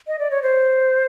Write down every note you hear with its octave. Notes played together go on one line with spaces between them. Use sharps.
D#5
D5
C#5
C5